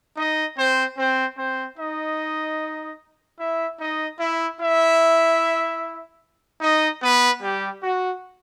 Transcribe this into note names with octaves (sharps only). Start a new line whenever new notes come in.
D#4 D#5
C4 C5
C4 C5
C4 C5
D#4 D#5
E4 E5
D#4 D#5
E4 E5
E4 E5
D#4 D#5
B3 B4
G3 G4
F#4